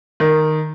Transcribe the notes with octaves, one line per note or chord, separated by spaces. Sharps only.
D#3